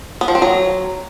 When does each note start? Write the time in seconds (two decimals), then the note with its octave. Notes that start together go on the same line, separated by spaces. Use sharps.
0.21 B3
0.28 F3
0.35 C4
0.42 F#3